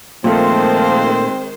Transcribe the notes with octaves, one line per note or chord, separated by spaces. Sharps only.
A#2 D#3 F3 G#3 A3 C4 C5